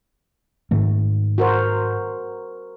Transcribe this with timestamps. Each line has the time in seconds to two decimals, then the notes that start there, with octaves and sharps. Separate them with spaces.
0.71 G#2 D#3 A3
1.38 F#4 A#4 C5